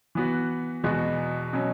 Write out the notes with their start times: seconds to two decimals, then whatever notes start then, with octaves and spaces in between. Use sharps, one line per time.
0.15 E3 B3 F#4
0.84 E2 B2 G#3 B3 F#4
1.53 B2 F#3 C#4